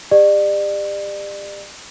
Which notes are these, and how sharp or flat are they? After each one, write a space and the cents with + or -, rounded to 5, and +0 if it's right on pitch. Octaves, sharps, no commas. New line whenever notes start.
G4 +40 D5 +35